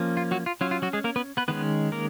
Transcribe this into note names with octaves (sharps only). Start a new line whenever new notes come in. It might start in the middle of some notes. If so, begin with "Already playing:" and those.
Already playing: F3 A#3 C#4
F4
F#3 F#4
F4
F#3 C#4 F4
F4
F#3 F#4
G#3 G#4
A#3 A#4
B3 B4
B3 B4
D#3 G#3 B3 C#4 B4
A#3 A#4